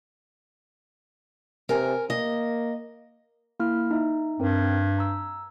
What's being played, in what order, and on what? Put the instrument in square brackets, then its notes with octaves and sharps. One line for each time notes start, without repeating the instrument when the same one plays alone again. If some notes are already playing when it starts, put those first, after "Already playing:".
[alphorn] C3 [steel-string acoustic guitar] A#4 G#5
[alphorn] A#3 [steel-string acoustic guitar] D#5
[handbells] A#3 E4 F6
D#4 E5
[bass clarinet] G2 [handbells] C4 A#4
[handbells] A#5 E6